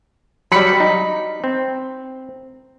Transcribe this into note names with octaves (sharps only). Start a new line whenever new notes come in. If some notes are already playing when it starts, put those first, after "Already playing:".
F#3 G3 B5 B6 C#7
D#4
C4